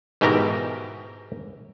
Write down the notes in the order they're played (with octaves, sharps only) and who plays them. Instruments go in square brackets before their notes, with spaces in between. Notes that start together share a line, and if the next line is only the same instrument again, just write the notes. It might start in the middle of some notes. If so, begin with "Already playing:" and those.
[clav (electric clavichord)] G#2 B2 E3 G4 A#4 A#5